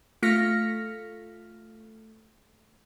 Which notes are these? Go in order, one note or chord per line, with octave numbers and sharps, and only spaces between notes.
A3 F4 F6 A#6 B6 C#7